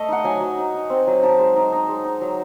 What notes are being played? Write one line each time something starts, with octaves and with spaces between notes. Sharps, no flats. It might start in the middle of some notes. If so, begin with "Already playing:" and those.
Already playing: A3 D#5
D#4 F#5
F#3 G#5
F#3
D#4
D#4
C4
F#3
D#4 A5
G#3
D#4
D#4
G#3
D#4
F#3